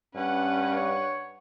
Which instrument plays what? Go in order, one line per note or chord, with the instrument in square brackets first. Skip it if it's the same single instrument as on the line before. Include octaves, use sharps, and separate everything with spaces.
[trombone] G2 [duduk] C#4 [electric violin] B4 F#5
[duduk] C#5